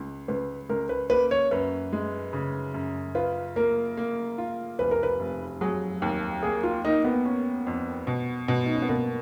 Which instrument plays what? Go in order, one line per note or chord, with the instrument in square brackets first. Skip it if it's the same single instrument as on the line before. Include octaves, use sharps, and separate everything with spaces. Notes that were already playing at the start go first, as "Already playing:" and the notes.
Already playing: [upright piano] C#2
[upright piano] C#2 [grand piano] B4
[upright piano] C#2 [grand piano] A#4
[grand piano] B4
[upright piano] A#3 [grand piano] B4
[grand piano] C#5
[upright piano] F#2 [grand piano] B4
[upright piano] G#3
C#3
F#2
[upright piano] F4 [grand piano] B4
[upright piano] A#3 [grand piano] A#4
[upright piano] A#3
F4
[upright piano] F1 [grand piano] B4
[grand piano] A#4
B4
[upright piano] F1
[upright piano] F#3 [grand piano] G#4
[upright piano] D#2
[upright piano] A#3 [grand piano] G#4
[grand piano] F4
[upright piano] A#3 [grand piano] D#4
[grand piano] B3
[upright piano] C#4
F2
B2
B2
[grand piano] D#4
C#4
B3
[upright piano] B2 [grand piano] A#3